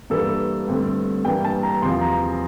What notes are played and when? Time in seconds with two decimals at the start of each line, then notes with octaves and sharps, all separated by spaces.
0.10 G2 E3 G3 A#3 A4
0.68 G2 D3 A3 C4
1.25 G2 E3 G3 A#3 G5
1.44 A5
1.63 A#5
1.82 E2 C3 F3 C6
2.01 A#5